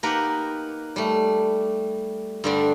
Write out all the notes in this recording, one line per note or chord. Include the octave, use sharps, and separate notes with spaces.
A#3 D#4 G4 A#4 B4 F#5
G3 A3
G2 D3 G3